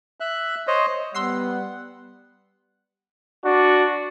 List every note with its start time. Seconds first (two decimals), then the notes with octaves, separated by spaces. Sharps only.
0.20 E5 F#6
0.67 C5 C#5 D#5
1.15 G3 B3 F#5 C6 E6 C7
3.46 D4 F#4